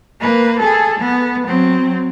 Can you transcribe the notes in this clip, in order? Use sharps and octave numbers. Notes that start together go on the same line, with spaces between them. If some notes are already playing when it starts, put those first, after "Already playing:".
A#3 B4
G#4 A4
B3
F#3 C4